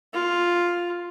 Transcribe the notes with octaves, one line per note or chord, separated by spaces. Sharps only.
F4